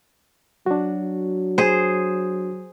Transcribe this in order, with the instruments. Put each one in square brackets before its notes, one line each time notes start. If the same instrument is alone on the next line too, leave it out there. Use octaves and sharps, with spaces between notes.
[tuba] F#3 [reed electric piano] D4 F#4
[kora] G#4 C5